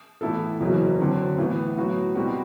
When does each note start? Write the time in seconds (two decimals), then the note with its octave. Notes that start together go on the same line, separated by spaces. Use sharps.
0.21 A2 E3 B3 E4 A4
0.60 F#1 E2 B2 F#3
1.00 D3 F#3 C4
1.38 A2 E3 B3
1.77 A2 F#3 B3 F#4
2.15 B2 G3 C4 F#4